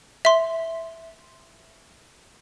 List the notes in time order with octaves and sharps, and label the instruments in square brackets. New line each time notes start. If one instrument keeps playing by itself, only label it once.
[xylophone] E5 C6